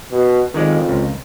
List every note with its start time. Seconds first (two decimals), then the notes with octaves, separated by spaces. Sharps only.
0.12 B2
0.54 F2 D#3 G#3 D5
0.88 C#2